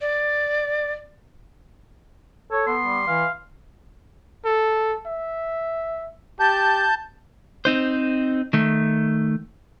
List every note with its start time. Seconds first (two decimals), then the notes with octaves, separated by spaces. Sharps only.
0.01 D5
2.51 A4 C#5
2.67 B3 C6
2.86 G3
3.07 E3 F5
4.45 A4
5.06 E5
6.40 G4 A5 G6
7.65 C4 D#4 C5
8.53 D#3 A3